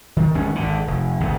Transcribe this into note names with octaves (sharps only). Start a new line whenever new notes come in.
D#3
G1 D#2 G#3 C#4
G#1 D3
F1
G1 D2 G#2 C3